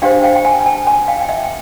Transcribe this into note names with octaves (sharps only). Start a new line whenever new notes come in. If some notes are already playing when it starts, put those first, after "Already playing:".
D4 G4 C5 F5 G5
F5 G5
G5
F#5 G#5
G#5
G5 A5
F#5 G#5
F5 G5
G5
E5 F#5
G5